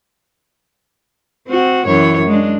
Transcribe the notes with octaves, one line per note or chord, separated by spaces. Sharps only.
C4 F#4
F#2 E3 C#5
G#3 D4